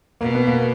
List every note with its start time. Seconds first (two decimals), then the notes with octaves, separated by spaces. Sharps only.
0.21 B2 A#3
0.35 B3
0.47 A#3